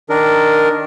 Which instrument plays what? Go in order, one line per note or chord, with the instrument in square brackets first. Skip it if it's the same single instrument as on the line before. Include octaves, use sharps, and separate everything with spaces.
[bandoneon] D#3 D4 A#4